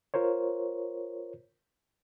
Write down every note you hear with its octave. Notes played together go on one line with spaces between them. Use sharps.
F4 A#4 C5 C#5